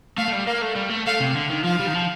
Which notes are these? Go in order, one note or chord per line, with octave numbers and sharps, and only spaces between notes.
A3 F5
A3
G3
A#3 F5
A3
G3
A3
A3 F5
C3
D3
D#3
F3 F5
G3
D#3
F3